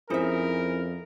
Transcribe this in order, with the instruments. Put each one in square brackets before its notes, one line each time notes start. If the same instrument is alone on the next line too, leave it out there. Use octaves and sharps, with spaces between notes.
[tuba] F2 [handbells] C#4 E4 G#4 [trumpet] A#4 [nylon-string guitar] C5 E5